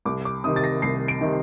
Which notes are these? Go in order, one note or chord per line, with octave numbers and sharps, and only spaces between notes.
C2 D6
D6
C3 D#3 D#6
A6
A#6
C2 C7
D7
C3 D#3